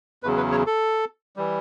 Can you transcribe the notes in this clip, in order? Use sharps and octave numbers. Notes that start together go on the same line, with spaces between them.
E2 C#3 F#3 B4
B4
C#5
A4
E3 G3